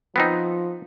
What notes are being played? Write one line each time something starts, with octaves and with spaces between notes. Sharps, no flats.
F3 B3 C4 D#4